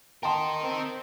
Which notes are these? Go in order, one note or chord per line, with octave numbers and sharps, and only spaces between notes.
A#4 D#5 G5 A5 C6
C4